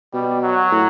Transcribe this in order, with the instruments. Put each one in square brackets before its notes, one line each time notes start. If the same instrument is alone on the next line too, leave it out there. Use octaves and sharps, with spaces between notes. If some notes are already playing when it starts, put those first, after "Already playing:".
[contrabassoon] B2 [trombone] G3
[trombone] F#3
[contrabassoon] A2